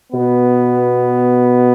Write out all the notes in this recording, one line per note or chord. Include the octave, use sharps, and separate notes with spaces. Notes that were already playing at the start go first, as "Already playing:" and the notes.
B2 B3